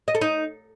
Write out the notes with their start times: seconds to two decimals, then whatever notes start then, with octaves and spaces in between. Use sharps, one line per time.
0.08 D#5
0.15 A4
0.21 D#4